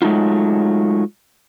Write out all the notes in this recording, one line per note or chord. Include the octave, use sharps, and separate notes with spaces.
F#3 G#3 A3 D#4 F4